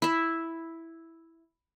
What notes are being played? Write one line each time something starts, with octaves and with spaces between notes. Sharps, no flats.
E4 E5